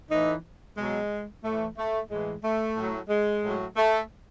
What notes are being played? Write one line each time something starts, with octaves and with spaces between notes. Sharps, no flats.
A2 E3 D#4
B2 F#3 G#3
A2 E3 A3
A3
A2 E3 G#3
A3
A2 F#3
G#3
A2 F#3
A3